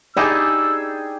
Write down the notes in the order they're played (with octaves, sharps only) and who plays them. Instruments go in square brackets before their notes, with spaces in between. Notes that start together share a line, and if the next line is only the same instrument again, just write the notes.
[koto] D#4 E4 [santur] G4 G#4 G5 [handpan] D5 [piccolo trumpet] E6